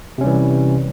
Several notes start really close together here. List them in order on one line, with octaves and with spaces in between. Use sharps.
C3 C#4 G3 E3